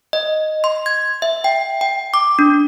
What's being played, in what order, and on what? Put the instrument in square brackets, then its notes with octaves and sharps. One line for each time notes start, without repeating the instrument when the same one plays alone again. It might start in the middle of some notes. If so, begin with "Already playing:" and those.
[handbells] D#5
C6
G#6
E5
G5
G5
D6
D4